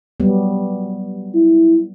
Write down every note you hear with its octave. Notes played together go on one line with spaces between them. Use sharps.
F#3 G3 B3
E4